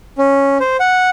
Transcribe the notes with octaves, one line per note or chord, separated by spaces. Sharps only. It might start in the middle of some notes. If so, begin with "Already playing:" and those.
C#4
C5
F#5